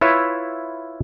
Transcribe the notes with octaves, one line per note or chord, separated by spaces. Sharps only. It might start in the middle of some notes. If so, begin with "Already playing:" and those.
E4 F4 B4 C#5 E5